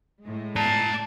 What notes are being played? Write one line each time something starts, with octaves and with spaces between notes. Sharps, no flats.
A2 G#3
D5 A5 A#5